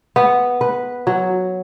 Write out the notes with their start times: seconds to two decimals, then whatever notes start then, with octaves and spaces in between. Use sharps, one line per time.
0.16 B3
0.61 B4
1.07 F#3